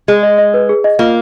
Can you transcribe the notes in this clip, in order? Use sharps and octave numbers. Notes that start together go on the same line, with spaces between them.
G#3 G#4
D#5
D#5
B4
G#4
D#5
A#3 F4